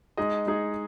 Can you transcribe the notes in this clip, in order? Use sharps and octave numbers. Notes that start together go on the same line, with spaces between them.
G#3 D#4 G#4 D#5
G#3 D#4 G#4 D#5